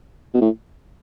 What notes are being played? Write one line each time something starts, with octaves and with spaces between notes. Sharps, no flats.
B2
A2